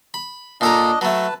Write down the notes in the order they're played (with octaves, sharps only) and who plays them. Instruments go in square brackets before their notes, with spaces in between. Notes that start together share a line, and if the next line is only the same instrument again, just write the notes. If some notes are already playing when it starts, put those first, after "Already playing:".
[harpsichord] B5
[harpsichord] A#2 A4 A#5 [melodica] D4 D#5
[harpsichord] F#3 A3 [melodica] B4 A5